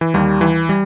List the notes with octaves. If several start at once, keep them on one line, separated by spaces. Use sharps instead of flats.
E3
D#2 D#3 G3
E3
G3